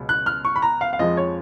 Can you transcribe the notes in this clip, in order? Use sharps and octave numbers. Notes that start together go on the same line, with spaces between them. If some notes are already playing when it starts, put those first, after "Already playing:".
Already playing: C#2 B2 F#3
F#6
F6
C#6
B5
A#5
F5
F5
F2 F3 G#3 D#5
C#5